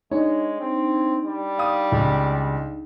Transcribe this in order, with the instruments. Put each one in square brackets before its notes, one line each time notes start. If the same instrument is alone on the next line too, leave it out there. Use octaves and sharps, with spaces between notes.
[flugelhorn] G#3 [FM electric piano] D4 D#4 [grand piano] C#5
[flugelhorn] C4
G3
[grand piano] F5 D#6
C#2